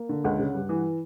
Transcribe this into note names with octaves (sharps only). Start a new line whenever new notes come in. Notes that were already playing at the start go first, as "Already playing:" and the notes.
Already playing: A#3
D3
C#2 F#5
C#3
G2
E3